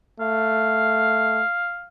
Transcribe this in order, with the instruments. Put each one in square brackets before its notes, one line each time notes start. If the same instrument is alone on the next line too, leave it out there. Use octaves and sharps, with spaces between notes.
[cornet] A3 [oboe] F5